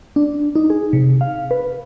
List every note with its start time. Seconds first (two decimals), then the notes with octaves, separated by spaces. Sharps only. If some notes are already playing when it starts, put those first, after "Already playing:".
0.16 D4
0.55 D#4
0.70 G#4
0.93 C3
1.21 F5
1.51 B4